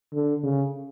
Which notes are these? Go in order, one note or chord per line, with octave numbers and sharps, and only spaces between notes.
D3
C#3